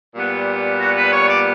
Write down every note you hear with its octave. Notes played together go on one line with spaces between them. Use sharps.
A#2 G3 B3
F#4
B4
C#5
D5